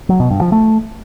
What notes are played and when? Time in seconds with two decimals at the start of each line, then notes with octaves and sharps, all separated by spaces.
0.09 F#3
0.20 B2
0.31 G2
0.41 F3
0.52 A3